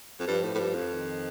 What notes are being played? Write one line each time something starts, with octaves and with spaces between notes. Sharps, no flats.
F2
G2 F3
A2
A2
G2
F2
D#3